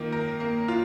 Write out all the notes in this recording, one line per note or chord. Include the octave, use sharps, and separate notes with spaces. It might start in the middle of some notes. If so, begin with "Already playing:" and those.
Already playing: D#3 A#3 F4
A#4
A#3
F4